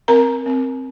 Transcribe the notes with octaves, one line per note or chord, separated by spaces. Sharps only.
C4 A#4 A#5
C4